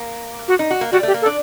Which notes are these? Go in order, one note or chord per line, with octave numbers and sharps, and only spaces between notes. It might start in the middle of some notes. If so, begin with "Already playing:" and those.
Already playing: A#3
F#4
D#4
F#4
A#3
G3 F#4
A3 G4
A#3
A4
D4